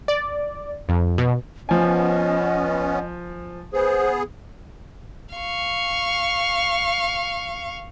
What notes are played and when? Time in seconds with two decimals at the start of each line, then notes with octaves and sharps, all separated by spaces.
0.08 D5
0.89 F2
1.18 B2
1.69 F3 B3 C#4 D#5 G#5
3.73 B3 G#4 C5
5.35 F5 C#6